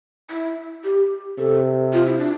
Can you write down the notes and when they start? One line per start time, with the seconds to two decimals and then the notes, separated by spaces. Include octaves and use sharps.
0.30 E4
0.84 G4
1.38 C3 A4
1.93 F4
2.06 E4
2.19 D4